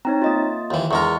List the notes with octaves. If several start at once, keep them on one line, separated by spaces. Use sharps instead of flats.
C4 D#4 C#5 A#5
A#3 F4 D#5 A6
D#2 E3
E2 G#3 A#4 D#5 C#6